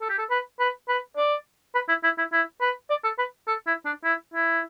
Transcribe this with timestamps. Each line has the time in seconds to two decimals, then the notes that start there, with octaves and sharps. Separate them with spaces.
0.01 A4
0.09 G4
0.18 A4
0.30 B4
0.60 B4
0.89 B4
1.17 D5
1.74 B4
1.89 E4
2.04 E4
2.18 E4
2.32 E4
2.61 B4
2.90 D5
3.04 A4
3.18 B4
3.47 A4
3.67 E4
3.85 D4
4.04 E4
4.34 E4